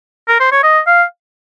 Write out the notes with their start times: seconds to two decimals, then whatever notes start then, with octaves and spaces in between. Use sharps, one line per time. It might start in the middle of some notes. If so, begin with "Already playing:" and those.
0.28 A#4
0.40 C5
0.52 C#5
0.63 D#5
0.87 F5